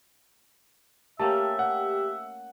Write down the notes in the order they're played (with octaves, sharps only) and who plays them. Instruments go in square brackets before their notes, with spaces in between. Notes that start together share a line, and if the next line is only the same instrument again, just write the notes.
[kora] A3 A#3 C#4 [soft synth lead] G4 [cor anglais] E5 [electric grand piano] A5
[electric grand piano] F#5